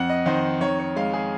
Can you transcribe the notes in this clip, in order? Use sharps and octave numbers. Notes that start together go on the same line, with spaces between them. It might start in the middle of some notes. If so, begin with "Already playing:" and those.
Already playing: F2 F#5
D#5
D#3 C5
D#3 C#5
C#5
G#3 F5
G#4